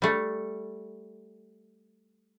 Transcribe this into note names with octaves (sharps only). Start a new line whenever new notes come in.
G3 A3